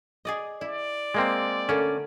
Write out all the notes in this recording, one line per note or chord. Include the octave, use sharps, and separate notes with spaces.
G#4 D5 D#5
E4 D5
G#3 A#3 C4
D3 A3 A#3 C#4